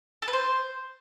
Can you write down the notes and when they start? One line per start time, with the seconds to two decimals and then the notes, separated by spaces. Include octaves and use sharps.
0.22 A4
0.28 B4
0.33 C5